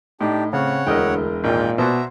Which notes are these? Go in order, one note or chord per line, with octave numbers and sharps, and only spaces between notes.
A2 D4 D#4 G4
C#3 C4 C#5 F#5
E1 D2 E4 A#4 D#5 G5
G#1 A#2 F4 G5
B2 C5 D5 E5 F#5 A#5